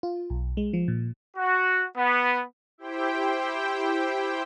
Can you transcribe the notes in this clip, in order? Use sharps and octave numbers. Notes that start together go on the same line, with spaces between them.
F4
B1
G#3
F3
A#2
F#4
B3
E4 G4 C5 G5